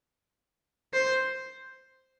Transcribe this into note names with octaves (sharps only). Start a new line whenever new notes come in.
C5